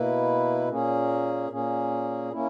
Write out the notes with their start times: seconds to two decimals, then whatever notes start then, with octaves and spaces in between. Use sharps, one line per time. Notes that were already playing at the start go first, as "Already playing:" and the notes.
Already playing: B2 A#3 E4 B4
0.69 A#2 A#3 C#4 G#4
1.50 A#2 A#3 C#4 G#4
2.32 A#3 C#4 E4